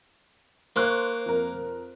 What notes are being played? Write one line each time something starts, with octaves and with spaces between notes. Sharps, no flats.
A#3 C5 C6 C#6 F#6
F2 A#4